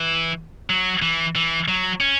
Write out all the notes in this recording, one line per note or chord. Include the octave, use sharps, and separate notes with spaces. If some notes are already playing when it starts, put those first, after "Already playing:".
Already playing: E3
F#3
E3
E3
F#3
C#4